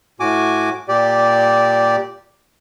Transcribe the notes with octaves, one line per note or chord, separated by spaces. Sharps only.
A2 F#4 G#5 D6
A#2 G4 D5